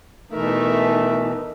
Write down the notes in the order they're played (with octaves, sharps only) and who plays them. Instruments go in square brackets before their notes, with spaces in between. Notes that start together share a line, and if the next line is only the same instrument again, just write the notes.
[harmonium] B2 E3 [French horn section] A3 [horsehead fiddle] D#4 B4 [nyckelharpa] A#4 E5